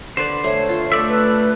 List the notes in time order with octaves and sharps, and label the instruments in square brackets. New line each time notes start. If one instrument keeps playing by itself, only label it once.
[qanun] D3 B4 D5 [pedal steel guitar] C5
[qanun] A3 [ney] C#5
[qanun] F4
[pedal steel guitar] A3 D5 E5 [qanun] A4
[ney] B4